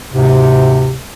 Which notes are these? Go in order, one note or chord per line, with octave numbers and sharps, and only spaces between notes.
D2 G#2 C3